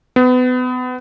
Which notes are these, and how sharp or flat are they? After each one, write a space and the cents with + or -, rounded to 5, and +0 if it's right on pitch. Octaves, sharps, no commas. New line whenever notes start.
B3 +30